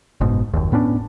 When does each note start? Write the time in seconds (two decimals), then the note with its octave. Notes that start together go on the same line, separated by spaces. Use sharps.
0.21 F#1 G#2 B2
0.54 F#1 D#2
0.72 A2 B3 C#4 D4